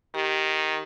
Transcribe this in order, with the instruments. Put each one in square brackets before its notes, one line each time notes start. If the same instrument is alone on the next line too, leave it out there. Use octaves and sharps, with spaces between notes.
[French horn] D#3 [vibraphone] G4